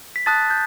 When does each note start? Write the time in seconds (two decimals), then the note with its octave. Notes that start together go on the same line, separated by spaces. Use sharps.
0.16 B6
0.26 A5 D#6 F#6 A6
0.50 G6